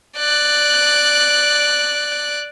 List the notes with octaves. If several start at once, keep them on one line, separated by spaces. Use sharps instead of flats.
D5 F#6